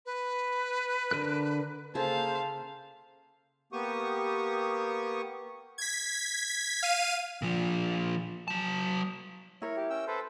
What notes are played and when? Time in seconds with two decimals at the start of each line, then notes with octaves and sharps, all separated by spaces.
0.06 B4
1.11 D3 A#4 F#6
1.95 C#3 A#3 G#4 A4 C5 F5 A5
3.72 A#3 B3 G4 C#6 D#6
5.78 G#6 B6
6.83 F5 D#7
7.42 A#2 F3
8.48 F#3 A5
9.62 E4 A#4 C#5
9.77 G4
9.90 C#4 G5 E6
10.07 A4 B4 C5